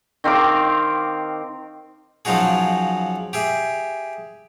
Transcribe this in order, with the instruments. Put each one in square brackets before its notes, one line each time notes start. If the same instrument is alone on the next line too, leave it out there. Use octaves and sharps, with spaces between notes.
[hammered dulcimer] D#3 C4 F5 D6
[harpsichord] C#3 F3 F#3 D#4 F#4 G#4
G4 G#4 E5